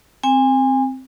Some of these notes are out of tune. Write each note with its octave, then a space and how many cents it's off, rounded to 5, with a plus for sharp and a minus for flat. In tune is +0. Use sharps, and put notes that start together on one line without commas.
C4 +0 G#5 -30